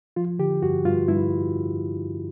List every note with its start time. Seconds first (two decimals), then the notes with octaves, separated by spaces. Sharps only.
0.16 F3 F4
0.39 D3 G4
0.63 G2 F#4
0.85 G2 F4
1.08 G2 E4